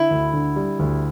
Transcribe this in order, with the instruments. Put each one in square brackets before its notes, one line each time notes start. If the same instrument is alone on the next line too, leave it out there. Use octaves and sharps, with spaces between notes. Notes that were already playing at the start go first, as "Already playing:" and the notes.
Already playing: [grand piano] D3 [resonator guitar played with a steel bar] E4
[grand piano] D2
D3
G3
D2